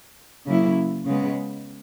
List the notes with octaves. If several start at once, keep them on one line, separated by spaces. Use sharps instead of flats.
C#3 F#3 A#3 E4
C#3 G#3 B3